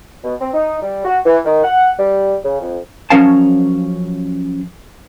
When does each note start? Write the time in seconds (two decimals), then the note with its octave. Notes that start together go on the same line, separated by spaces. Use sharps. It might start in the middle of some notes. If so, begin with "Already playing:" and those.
0.24 B2
0.40 C4
0.54 D#4
0.82 G3
1.05 F#4
1.26 E3
1.45 D#3
1.64 F#5
1.99 G3
2.44 C#3
2.60 F2
3.10 F3 F#3 C#4 A#4 F5 A5